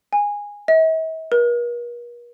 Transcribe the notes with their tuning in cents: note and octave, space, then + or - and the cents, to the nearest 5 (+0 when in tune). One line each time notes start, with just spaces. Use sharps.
G#5 -15
E5 -45
A#4 +45